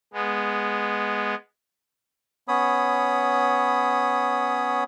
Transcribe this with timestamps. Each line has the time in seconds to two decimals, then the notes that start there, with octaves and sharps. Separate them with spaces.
0.13 G#3 B3
2.48 B3 C#4 C#5 B5 D#6